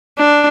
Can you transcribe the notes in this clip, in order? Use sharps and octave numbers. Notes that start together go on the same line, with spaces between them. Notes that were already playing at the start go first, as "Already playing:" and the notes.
D4